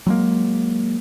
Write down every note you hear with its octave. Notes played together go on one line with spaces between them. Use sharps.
F#3 G#3 A#3